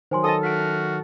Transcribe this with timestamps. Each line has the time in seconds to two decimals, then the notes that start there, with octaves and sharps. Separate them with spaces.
0.11 D#3 F#3 C5 G#5 C6
0.24 A4 D#5 A5 D#6
0.43 F#4 F6 B6 D7